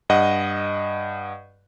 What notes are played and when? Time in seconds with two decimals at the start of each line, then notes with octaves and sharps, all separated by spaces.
0.10 G2 D#5 F#5